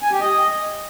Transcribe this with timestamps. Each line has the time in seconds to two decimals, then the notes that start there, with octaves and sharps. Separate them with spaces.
0.03 G#5
0.11 G4
0.20 D#5